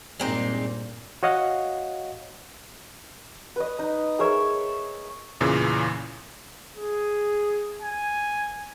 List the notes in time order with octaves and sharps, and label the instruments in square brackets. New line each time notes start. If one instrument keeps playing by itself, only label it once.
[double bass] G2 A#2 [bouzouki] G#3 C4 D#4
[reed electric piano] F#4 C#5 D#5 F5 F#5
[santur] B4 D#5
D#4
G#4 A#4 C#5 E5
[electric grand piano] E2 A#2 C#3 E3
[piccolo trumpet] G#4
G#5